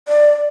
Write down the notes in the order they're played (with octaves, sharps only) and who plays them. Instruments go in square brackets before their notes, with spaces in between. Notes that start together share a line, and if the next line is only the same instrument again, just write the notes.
[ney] D5